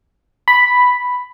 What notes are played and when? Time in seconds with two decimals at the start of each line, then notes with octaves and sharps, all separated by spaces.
0.48 B5